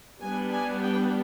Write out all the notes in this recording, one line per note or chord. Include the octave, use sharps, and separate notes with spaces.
G3 B3 D4 G#5
G#5
G5